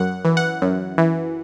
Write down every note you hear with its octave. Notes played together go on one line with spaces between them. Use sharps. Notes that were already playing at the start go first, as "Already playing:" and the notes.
Already playing: F#2 F#5
E3
F#5
F#2
E3